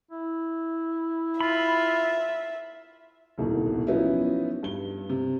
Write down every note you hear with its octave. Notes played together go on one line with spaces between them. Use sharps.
E4
F4 E5 B5
D#1 C2 B2 D#3
F3 F#3 B3 C#4 D#4 E4
G2 G7
C3